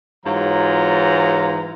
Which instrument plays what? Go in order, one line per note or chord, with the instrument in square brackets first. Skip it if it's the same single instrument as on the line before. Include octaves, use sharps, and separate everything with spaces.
[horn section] G#2 E3 F#3 F4 A#5